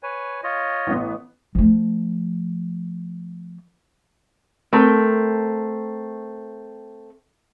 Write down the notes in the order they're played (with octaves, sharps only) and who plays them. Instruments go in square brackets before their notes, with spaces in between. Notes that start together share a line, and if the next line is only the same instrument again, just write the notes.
[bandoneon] B4 C#5 G#5
F4 C#5 D#5
[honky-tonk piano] A1 B3
[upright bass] F3 A3
[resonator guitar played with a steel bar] A3 C4 A#4